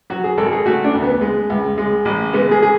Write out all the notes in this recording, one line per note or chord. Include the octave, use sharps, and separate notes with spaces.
F#3 F#4
G#4
G#1 A4
G#4
A3 F#4
D4
D2
B3
G#3
C#2
G#3
A1
G#3 B3
G#4
G#4